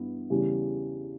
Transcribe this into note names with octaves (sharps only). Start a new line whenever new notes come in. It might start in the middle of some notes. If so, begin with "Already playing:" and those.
Already playing: G2 E3 B3 E4
E2 C#3 G3 C#4 G4